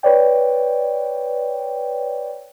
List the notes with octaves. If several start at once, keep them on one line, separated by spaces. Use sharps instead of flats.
B4 C#5 D5 G5